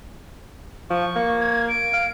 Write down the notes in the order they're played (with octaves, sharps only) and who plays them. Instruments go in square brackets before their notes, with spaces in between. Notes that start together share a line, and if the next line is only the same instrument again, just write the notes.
[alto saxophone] F3 [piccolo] C#6
[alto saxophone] A#3
[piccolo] G#6
D7
[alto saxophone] F5